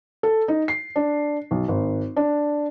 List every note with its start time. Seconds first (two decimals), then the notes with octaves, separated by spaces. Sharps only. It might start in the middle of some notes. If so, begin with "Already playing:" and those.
0.23 A4
0.48 D#4
0.68 C7
0.96 D4
1.51 B1
1.68 G#1
2.16 D4